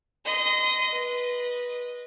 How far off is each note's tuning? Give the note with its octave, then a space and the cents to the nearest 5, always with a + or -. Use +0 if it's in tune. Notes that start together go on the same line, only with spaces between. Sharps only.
D#5 +0 C6 -30
B4 -15 D#5 -5